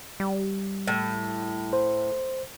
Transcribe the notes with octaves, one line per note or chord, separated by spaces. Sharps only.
G3
A2
C5